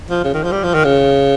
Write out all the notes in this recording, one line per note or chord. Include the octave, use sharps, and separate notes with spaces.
F3
C#3
D#3
F3
G3
F3
D#3
C#3